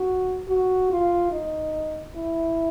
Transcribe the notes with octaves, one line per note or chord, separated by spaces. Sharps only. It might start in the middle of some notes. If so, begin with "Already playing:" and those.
Already playing: F#4
F#4
F4
D#4
E4